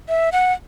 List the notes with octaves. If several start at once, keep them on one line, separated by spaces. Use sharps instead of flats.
E5
F#5